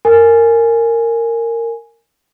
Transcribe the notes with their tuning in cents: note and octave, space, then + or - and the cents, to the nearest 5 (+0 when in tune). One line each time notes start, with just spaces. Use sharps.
A#4 -15 G#5 +0